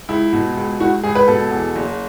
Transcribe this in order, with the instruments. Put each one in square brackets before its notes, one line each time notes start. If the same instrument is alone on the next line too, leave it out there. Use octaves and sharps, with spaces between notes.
[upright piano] C#2 E4
B2
C#2
C#2 F#4
C#2 G#4
B4
B2 A4
E2
F#1